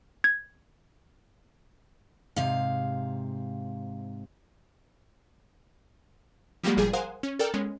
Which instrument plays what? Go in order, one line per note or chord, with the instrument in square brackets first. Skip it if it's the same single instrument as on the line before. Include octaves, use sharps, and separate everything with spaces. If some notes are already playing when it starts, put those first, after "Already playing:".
[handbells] G#6
[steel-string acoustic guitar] G#2 C3 F5
[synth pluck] F3 G3 G#3 A#3 F#4 G4
G1 A#2 F3 G3 G#4
A#4 C5 F5 F#5 G#5 D#6
C#4
A4 A#4 D5 G5 F6
G#3 B3 C#4